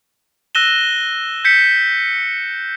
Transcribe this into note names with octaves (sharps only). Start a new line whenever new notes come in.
E6 F#6 A#6 D#7 E7 G7
G6 B6 C#7